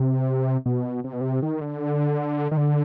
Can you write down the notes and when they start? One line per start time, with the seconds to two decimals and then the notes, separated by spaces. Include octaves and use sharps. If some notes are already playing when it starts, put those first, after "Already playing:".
Already playing: C3
0.66 B2
1.04 C3
1.13 B2
1.21 C3
1.42 D#3
1.61 D3
2.51 D#3
2.57 D3